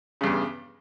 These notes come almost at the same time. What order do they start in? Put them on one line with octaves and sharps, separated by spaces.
C#3 G2 E2